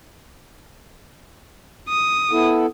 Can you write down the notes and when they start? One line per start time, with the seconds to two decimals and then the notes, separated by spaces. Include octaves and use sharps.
1.89 D#6
2.31 B3 E4 A4